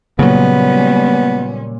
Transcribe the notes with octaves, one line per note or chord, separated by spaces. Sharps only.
A#2 C#3 F#3 G3 B3 C#4